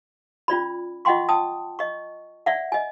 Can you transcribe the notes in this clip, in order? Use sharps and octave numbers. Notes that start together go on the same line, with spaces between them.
C#4 F4 D5 B5
F4 D#5 F#5 G5 C6 C#6
G5 A5 D#6
D#5 C#6
D5 E5 F#5
D#5 G#5